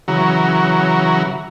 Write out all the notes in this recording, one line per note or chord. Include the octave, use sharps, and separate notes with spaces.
C#3 E3 F#3 F#4 A#5